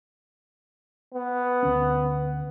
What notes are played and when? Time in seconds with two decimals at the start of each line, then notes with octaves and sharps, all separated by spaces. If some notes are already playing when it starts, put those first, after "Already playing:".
1.14 B3
1.63 D2 C#4